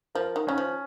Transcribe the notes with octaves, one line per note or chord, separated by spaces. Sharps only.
F3 A#4
D#3
D#3 C#4
F3